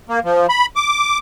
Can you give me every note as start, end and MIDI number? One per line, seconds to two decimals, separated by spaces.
0.09 0.19 58
0.25 0.47 53
0.49 0.66 83
0.76 1.18 86